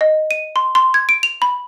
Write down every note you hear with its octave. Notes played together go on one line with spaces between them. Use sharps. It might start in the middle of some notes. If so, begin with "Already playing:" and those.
D#5
D#7
C6
C6
G#6
D7
F7
B5